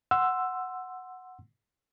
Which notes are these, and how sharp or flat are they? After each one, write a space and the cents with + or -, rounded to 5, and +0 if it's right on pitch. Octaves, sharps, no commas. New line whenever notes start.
F#5 +0 C6 +0 E6 +10